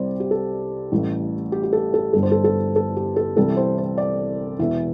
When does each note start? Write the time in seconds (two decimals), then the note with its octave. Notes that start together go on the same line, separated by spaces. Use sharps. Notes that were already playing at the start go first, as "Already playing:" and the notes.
Already playing: C2 C3 G3 C5 D5
0.20 G4
0.31 A4
0.92 A1 A2 G3
1.52 G4
1.63 G4
1.73 A4
1.94 A4
2.13 G1 G2 G3 A4
2.23 C5
2.32 A4
2.44 A4
2.76 A4
2.96 G4
3.16 A4
3.37 C2 C3 E3 G3 A4
3.57 C5
3.78 C5
3.98 D5
4.59 E1 E2 E3 E5